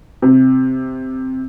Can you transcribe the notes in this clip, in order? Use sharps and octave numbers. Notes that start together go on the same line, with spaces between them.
C3